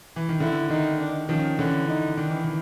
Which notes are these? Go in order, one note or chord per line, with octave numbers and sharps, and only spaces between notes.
E3
D#3
D3 E4
D#3 D#4
D4
D#3 F3 C#4
D3 E3 C#4
D#4
D#3 D4
E3
D#3